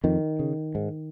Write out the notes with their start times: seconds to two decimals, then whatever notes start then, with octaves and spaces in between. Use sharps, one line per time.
0.04 F2 D#3
0.39 C#3
0.75 G#2